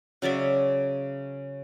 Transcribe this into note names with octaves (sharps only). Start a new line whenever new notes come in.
C#3 F#3 D5 E5